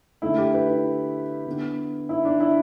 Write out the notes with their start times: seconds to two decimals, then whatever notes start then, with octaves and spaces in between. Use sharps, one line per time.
0.22 D3 A3 E4
0.38 G4
0.54 B4
0.68 E4
1.47 D3 B3
2.09 E4
2.25 D4
2.40 E4